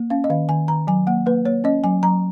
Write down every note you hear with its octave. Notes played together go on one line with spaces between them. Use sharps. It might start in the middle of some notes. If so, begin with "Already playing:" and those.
Already playing: A#3
C#4 F5
D#5
D#3 F5
D#3 G#5
D#3 A#5
F#3 G#5
A#3 F#5
A#3 B4
A#3 C#5
C#4 D#5
F#3 G#5
F#3 A#5